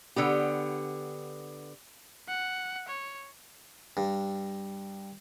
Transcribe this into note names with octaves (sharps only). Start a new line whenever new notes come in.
D3 B3 G4
F#5
C#5
G2